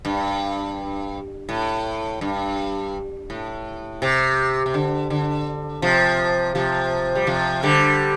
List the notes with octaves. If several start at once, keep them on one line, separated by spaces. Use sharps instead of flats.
G2
A2
G2
A2
C3
C3
D3
D3
C3 F3
C3 F3
G3
C3 F3
D3 G3